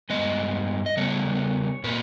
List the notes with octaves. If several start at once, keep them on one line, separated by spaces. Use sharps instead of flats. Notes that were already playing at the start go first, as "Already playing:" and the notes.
G2 D#3 G#3 B3 D#5
D#5
C#3 G3 B3 C#5
A#2 A#3 B4